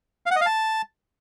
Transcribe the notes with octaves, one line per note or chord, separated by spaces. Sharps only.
F5
F#5
D#5
F5
A5